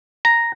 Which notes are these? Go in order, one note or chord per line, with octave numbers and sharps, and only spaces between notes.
A#5